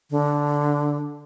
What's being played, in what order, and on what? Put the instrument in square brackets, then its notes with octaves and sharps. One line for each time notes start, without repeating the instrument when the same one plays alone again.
[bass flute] D3